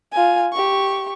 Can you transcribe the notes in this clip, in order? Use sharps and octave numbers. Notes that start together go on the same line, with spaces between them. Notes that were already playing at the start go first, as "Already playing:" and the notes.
F4 G#5
G4 C#6